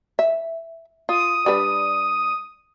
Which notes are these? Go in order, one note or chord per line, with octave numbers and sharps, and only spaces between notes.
E5
F4 D#6
G3 D4 B4